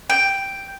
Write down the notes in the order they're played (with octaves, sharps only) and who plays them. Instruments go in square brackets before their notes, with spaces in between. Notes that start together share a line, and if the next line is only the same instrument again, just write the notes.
[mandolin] G5